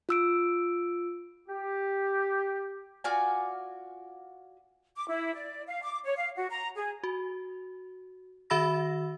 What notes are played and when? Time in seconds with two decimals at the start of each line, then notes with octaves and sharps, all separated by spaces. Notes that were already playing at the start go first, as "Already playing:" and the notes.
0.09 F4 E6 D7
1.49 G4
3.04 F4 F#4 D5 G#5
4.96 D6
5.08 E4
5.35 D5
5.67 F5
5.83 D6
6.04 C#5
6.17 F5
6.36 F#4
6.50 A#5
6.75 G#4
7.03 F#4
8.50 D#3 F#4 E5 B5 E6 A#6